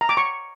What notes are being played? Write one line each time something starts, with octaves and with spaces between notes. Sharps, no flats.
A#5
D6
C#6